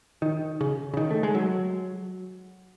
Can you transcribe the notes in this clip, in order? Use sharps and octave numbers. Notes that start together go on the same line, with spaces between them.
D#3
C#3
C#3
D#3
A3
G#3
F#3